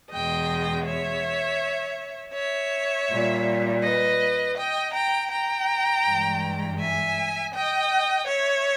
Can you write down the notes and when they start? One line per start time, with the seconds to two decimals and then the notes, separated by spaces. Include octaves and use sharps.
0.11 E2 B2 G#3 D#5 G5
0.86 C#5 E5
2.34 C#5 E5
3.09 A#2 G3
3.83 B4 D#5
4.57 D#5 G5
4.94 G5 A#5
5.31 G5 A#5
6.05 G2 E3 G#3
6.80 E5 G#5
7.54 D#5 G5
8.28 C#5 E5